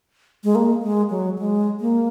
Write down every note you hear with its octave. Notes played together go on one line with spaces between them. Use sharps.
G#3
A#3
G#3
F#3
G#3
A#3